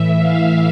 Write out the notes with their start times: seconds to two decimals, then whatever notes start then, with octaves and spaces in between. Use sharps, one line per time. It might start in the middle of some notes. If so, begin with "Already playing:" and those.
Already playing: A2 E3 E5
0.18 F5